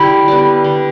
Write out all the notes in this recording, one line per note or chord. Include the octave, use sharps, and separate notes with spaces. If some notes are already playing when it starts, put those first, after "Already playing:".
Already playing: D3 E4 G4
G3 B3
D3